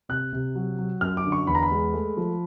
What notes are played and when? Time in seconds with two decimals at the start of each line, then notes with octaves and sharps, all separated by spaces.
0.09 C3 F#6
0.33 C3
0.55 F#3
0.79 F#3
1.01 F#2 F6
1.17 D6
1.24 D3
1.32 C#6
1.47 E2 B5
1.55 A#5
1.63 B5
1.71 G#3
1.94 A3
2.17 F3